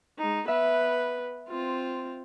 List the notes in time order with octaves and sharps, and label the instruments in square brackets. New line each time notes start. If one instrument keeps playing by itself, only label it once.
[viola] G#3 D#4
[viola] B3 B4 [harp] E5
[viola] C4 F4